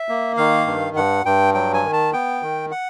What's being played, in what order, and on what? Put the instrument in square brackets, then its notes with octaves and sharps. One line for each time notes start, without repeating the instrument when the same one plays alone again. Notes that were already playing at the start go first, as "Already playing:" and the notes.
Already playing: [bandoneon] E5
A#3
D#3 F5
G2
G2 F#5
G2 G5
F#3 G5
G#5
D#3
A5
B3 G5
D#3
F#5